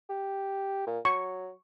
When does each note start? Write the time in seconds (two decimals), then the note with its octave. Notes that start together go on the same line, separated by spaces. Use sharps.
0.09 G4
0.87 A#2
1.05 F#3 C#6